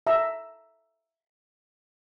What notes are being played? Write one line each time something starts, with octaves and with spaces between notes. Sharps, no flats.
E5 A#5 E6